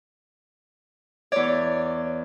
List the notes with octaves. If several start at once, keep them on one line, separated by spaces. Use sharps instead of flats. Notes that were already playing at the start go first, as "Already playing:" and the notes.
E2 C#5 D5